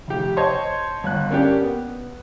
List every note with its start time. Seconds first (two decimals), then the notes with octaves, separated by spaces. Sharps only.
0.08 F1 G4
0.37 C5 C#5 D#5 A5 C6 C#6
1.04 G1 F#6
1.30 A#3 C#4 D4 G4
1.61 B3